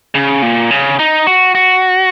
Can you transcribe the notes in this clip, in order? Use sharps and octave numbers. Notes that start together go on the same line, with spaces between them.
C#3
A#2
C#3
D#4
F#4
F#4